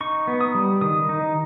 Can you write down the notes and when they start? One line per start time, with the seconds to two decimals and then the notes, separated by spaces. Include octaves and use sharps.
0.01 D#4 C#6
0.27 B3
0.41 D#6
0.54 G3
0.81 D#3 D#6
1.09 D#4